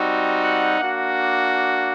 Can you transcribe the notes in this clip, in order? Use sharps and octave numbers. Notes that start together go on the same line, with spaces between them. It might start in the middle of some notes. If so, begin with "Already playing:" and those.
Already playing: G3 C4 D#4 F#4
F#5
A#3 D4 F#4